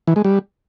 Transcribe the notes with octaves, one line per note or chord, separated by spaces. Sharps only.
E3
G#3
G3